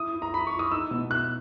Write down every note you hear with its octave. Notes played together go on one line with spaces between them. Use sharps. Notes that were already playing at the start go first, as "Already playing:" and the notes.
Already playing: E4 D#6
E4
A#5
E4 B5
E4 C#6
D#6
D#4 E6
B2
B2 F#6